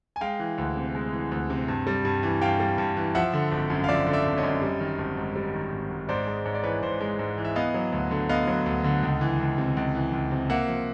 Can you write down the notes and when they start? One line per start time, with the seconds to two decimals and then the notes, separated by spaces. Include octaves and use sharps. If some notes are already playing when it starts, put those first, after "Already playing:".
0.16 G#5
0.21 G#3 F5 G5
0.39 E3
0.58 D2
0.76 C3
0.95 G#3
1.13 E3
1.32 D2
1.50 C3
1.68 G2
1.87 G3
2.05 G2
2.23 E3
2.42 G2 F5 G5
2.60 G3
2.78 G2
2.97 E3
3.15 F3 E5 F#5
3.33 D3
3.52 G#1
3.70 F#2
3.84 F5
3.88 F3 D5 E5
4.07 D3
4.13 D5 E5
4.26 G#1
4.37 C#5 D#5
4.43 F#2
4.62 G3
4.80 D#3
4.98 G#1
5.17 G#2
5.36 G3
5.54 D#3
5.72 G#1
5.91 G#2
6.09 G#2 C5 D5
6.27 G#3
6.45 G#2 C#5
6.55 D5
6.63 E3 B4 C#5
6.82 G#2 C5
7.01 G#3
7.19 G#2
7.38 E3
7.45 E5
7.56 B3 D#5 F5
7.74 F#3
7.92 D2
8.11 D3
8.29 B3 D#5 F5
8.47 F#3
8.66 D2
8.84 D3
9.02 C#2
9.21 E3
9.39 C#2
9.58 C3
9.77 C#2
9.95 E3
10.13 C#2
10.31 C3
10.50 A#3 E5 F#5
10.68 F3